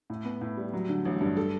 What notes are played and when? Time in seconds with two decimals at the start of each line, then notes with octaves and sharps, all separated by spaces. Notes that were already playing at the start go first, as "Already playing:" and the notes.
0.10 A2
0.25 B3
0.41 A2
0.57 G3
0.74 F#3
0.89 D3
1.05 A1
1.21 G2
1.37 A4